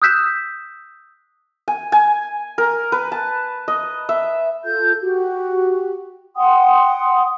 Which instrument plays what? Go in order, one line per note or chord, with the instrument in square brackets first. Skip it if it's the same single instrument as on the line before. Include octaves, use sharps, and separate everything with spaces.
[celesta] D#6 E6 F#6 G6 B6 E7
[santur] G#5
G#5
A#4
B4
A5
D#5
E5
[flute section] F4 A4 G6
F#4 G4
F#5 G5 C6 D#6